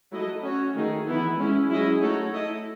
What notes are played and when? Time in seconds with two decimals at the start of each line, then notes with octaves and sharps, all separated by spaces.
0.11 F#3 A3 E4 A4 D#5
0.42 C#4 F#4 C#5
0.75 D#3 A3 D#4 G#4
1.06 E3 B3 E4
1.38 G#3 C#4 E4
1.69 F#3 C#4 E4 G#4 D#5
2.01 A3 D#4 F#4 A4 C#5
2.33 A3 E4 A4 D#5